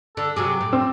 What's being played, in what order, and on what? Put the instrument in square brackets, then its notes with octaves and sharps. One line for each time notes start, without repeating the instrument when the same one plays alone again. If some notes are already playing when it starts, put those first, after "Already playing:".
[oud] D3 [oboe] A4
[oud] C3 F#3 G#4 [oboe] D6
[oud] A2
[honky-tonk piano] C4 E6